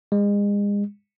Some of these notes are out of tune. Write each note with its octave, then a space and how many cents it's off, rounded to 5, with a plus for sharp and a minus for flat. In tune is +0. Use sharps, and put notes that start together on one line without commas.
G#3 -35